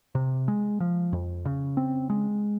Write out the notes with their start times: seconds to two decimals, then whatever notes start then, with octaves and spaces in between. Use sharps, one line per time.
0.15 C3
0.48 G#3
0.80 F3
1.13 F2
1.45 C#3
1.77 C4
2.10 G#3